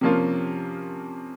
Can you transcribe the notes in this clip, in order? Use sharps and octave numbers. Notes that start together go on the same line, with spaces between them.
C3 F3 A#3 C#4 F4